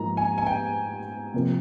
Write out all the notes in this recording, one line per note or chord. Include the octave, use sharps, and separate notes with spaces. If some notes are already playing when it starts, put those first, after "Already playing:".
Already playing: G#2 F3 A#3 A#5
G#5
G#5
G5
C3 F3 A#3